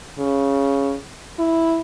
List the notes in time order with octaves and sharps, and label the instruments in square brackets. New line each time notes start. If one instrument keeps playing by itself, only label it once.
[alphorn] C#3
E4